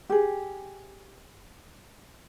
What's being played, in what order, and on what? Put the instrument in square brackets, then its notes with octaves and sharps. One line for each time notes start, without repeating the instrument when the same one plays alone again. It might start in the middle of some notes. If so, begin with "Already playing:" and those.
[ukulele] G4 G#4